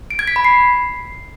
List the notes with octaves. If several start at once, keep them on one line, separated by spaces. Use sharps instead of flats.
D7
G#6
B6
B5
C7